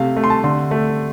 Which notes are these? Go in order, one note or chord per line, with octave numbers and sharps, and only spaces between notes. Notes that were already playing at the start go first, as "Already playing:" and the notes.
Already playing: C3 A3 F5
A3
C6
A5
D3 C6
A3